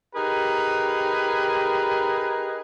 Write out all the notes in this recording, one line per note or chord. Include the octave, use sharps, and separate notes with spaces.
D#4 G4 G#4 A#4 B4